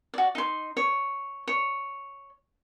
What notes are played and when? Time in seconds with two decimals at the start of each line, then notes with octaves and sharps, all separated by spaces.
0.14 F#4 D5
0.35 D#4 C6
0.77 C#5
1.48 C#5